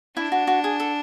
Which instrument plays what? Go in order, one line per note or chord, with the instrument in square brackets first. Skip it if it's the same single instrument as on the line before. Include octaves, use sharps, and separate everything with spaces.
[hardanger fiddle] D4 [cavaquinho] E4
[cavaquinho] F#4
F#4
G#4
A4